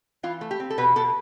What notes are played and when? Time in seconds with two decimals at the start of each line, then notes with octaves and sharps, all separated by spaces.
0.23 E3 F4
0.41 A3
0.51 G4
0.60 C4
0.70 A4
0.78 B2 B4
0.96 B2 A4